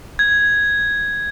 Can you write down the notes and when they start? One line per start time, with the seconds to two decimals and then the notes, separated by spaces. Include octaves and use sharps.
0.19 G#6